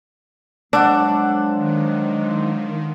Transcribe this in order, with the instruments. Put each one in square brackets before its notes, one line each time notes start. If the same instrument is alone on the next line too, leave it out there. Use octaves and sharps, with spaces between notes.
[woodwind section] F3 F#3 G#3 [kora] D4 [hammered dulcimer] A4 D5 F#5
[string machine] D#3